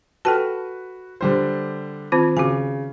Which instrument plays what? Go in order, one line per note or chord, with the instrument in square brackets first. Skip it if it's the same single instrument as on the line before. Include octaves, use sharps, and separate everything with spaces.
[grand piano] F#4 B4 [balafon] A4 G5 A5
[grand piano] D3 G3 C5
[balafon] D#3 C4 F4
[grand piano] C#3 [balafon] F#4 G#5